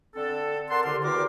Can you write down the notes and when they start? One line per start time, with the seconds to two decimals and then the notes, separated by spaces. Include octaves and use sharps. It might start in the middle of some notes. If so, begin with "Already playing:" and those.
0.15 D3 C4 D4 A4
0.70 A#4 D5 F#5 A5 C6
0.84 C2 D3 A#4 D5 C6
1.04 E2 D#3 F#4 G4 A#4 D6